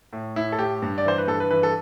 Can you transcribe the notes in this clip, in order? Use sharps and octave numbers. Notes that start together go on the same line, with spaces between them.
A2
A2 E4
A4
A2 G4
G2
D5
E3 C5
B4
G2 A4
B4
E3 B4
A4